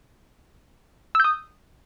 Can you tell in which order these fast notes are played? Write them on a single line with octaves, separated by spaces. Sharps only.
E6 G6 D#6